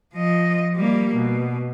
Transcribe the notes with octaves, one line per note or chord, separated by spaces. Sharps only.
F3 D#5
G3 A#3
B2